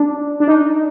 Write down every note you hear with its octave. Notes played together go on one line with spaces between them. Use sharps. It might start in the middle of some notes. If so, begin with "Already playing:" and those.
Already playing: D4
D4
D#4